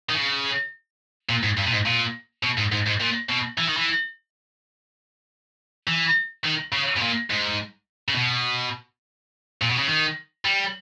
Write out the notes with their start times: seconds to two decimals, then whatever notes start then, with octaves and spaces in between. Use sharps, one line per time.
0.09 D#3
0.14 C#3
1.29 A#2
1.43 G#2
1.57 G2
1.67 A#2
1.72 G#2
1.86 A#2
2.43 B2
2.58 G#2
2.72 G#2
2.86 G#2
3.00 A#2
3.29 B2
3.58 E3
3.68 D#3
3.77 E3
5.87 E3
6.44 D#3
6.72 C#3
6.96 B2
7.01 A#2
7.30 G#2
8.08 C#3
8.15 B2
9.62 A#2
9.70 B2
9.78 C#3
9.87 D#3
10.45 G3